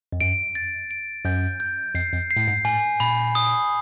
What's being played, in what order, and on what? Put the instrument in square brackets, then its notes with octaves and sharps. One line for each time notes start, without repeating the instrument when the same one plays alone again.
[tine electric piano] F2
[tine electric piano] F#2 [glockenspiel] D7
[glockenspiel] A6
D7
[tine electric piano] F#2 [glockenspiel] G6
[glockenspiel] G6
[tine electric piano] F2 [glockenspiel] C7
[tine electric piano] F2
[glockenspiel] C7
[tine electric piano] A2
G#2
[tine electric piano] A2 [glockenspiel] G#5
[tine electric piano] A#2 [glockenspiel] B5
[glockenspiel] D#6